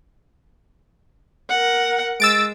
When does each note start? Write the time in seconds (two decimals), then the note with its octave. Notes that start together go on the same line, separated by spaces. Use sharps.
1.49 A#4 F#5
2.20 G#3 E6 A6 D7